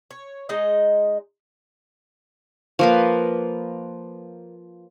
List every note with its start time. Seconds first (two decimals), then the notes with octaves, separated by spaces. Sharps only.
0.11 C#5
0.49 G#3 D#4 D#5
2.79 F3 A#3 B4